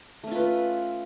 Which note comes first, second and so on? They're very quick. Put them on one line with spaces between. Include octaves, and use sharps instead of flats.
A3 C#4 F4 B4